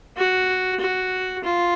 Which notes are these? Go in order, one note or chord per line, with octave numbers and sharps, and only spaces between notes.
F#4
F#4
F4